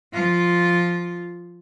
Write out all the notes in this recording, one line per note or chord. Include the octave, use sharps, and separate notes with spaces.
F3 F4